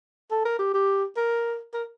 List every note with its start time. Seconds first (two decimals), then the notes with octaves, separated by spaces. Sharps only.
0.31 A4
0.45 A#4
0.59 G4
0.74 G4
1.17 A#4
1.74 A#4